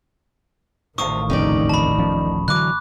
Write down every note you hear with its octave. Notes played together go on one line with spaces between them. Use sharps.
A1 D2 C3 D#3 F4 C#6 D#6
D#1 F2 C#3 D#4 G4 D5
A5 B5
D1 F3 C#4
D3 E3 F#3 D6 F#6